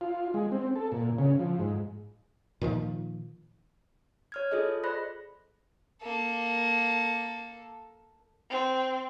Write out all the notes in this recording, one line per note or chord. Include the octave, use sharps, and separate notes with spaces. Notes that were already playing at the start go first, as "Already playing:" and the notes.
F4
G#3
C4
A4
A#2
C#3
F3
G#2
A#2 D#3 F3
C#5 F6 G#6
F4 G#4 A4 D#5
C5 D5 B5 F#6 A#6
A#3 A4
C4